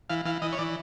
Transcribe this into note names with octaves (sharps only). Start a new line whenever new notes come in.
E3 F5
E3 F5
E3 D#5
C#5
E3 D5